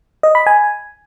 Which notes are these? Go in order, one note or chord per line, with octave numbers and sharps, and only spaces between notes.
D#5
B5
G#5